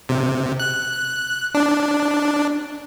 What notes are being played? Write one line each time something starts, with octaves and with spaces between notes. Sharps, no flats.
C3
F#6
D4